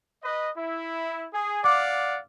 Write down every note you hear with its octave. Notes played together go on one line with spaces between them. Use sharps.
B4 D#5
E4
G#4
D5 F5 F#5 D6